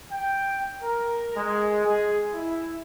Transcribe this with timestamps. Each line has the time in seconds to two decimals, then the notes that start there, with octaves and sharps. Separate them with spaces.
0.11 G5
0.81 A#4
1.35 G#3
1.84 G#4
2.34 E4